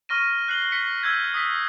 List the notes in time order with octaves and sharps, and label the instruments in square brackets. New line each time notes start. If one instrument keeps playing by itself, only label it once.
[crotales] C#6 F6 A#6 D#7
F#6 C7 F#7 G7
B6 C#7
E6 G6 G#6
D#6 B6